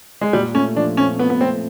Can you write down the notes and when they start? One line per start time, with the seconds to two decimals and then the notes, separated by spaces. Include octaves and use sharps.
0.21 G#3
0.33 A#2 G3
0.54 A3 C#4
0.76 F3 D4
0.97 C4 C#4
1.19 A#2 B3
1.30 B3
1.41 A3 C4